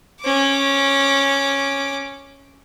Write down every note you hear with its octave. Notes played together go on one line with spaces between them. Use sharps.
C#4 D6